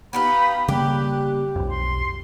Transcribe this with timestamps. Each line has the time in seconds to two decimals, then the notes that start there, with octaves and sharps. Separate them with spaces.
0.13 B3 D#4 F4 G4 B4 B5
0.68 C#3 G3 A#3 G4 F#6
1.56 B1 F2
1.69 C6